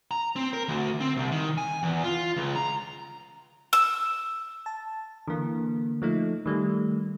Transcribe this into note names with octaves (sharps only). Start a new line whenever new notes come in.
A#5
C4
A#4
D2
C4
C2
D#3
G#5
E2
F4
C#2
A#5
E6
A5
D3 E3 A#3
F3 A3 D#4
D#3 G3 A3